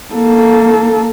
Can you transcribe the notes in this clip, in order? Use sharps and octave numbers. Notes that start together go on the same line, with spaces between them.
A#3 A4